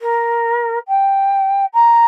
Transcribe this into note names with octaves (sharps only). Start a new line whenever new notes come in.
A#4
G5
A#5